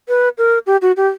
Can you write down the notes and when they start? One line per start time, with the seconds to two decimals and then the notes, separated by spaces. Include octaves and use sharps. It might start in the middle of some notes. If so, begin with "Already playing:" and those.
0.08 B4
0.38 A#4
0.66 G4
0.82 F#4
0.97 G4